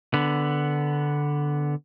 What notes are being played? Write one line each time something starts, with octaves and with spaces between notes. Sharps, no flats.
D3 B3